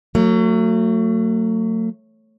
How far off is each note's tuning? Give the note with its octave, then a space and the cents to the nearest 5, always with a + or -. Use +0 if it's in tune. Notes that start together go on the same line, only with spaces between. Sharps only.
F#3 -10 A3 +35